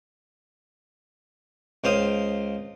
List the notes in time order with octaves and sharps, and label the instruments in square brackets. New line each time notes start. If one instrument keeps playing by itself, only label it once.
[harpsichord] C#2 C5 F5 D#6